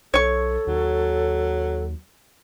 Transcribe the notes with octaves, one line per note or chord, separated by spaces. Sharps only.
B1 A4 C#5 C#6
D#2 F#3